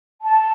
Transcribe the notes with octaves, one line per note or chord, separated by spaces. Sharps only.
A5